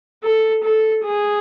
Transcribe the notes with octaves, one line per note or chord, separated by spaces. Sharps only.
A4
A4
G#4